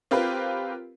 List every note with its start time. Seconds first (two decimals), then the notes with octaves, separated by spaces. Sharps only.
0.11 C4 F4 G4 A#4 B4